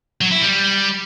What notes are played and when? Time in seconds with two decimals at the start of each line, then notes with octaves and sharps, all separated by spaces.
0.21 F#3
0.31 E4
0.42 G3